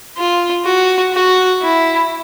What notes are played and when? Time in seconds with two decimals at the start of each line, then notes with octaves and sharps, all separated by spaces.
0.17 F4
0.66 F#4
1.13 F#4
1.62 E4